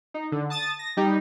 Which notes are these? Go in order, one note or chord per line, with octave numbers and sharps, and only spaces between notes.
D#4
D3
A5 D#6 A6
A#6
G3 D#4 G4